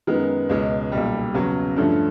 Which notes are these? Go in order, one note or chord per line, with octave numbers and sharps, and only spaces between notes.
F#2 D#3 G#3 B3
C#2 B2 G#3 C#4
B1 A#2 G3
E2 C#3 F#3
G2 D3 F3 A3 C#4